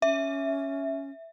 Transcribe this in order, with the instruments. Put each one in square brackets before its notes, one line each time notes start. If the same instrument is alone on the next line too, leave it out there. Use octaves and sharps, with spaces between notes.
[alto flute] C#4 [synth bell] E5